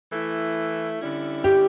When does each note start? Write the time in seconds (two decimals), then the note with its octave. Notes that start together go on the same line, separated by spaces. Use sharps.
0.11 E3 A3 E4
1.01 D3 G3 C#4 E4
1.44 G4